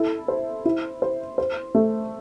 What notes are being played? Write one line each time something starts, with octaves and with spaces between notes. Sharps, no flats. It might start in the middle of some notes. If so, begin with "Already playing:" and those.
Already playing: E4 A4
C5
E4
C5
C5
A3